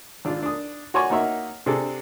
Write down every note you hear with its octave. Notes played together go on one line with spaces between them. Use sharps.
G#1 D4 F4
D4 D#6
F#4 C#5 D5 G#5 C#6
A#3 D#4 F#4 C#5 E5
C3 D4 G#4 A4